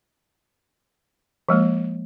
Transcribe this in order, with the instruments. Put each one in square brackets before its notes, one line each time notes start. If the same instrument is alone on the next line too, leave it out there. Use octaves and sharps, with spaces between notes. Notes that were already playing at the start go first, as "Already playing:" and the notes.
[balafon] F3 G#3 A#3